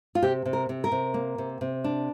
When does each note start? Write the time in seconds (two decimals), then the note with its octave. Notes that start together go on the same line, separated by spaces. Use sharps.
0.15 F4
0.22 C3 G4
0.45 C3
0.53 A#4
0.69 C3
0.84 A#4
0.92 C3
1.14 A#3
1.38 C3
1.61 C3
1.84 D4